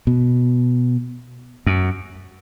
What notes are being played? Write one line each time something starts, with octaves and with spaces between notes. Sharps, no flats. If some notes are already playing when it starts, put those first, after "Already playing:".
B2
F#2